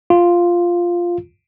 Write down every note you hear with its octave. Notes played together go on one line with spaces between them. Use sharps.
F4